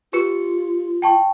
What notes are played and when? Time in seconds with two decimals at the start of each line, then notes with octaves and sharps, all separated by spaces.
0.13 F4 G4 B4 C#7
1.02 G5 A5 C#6